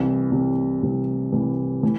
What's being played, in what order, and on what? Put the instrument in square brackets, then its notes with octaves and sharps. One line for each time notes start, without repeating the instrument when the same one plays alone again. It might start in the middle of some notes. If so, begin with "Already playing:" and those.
Already playing: [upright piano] C2 C3 E3
C2 C3 E3
C2 C3 E3
C2 C3 E3
A2 E3 A3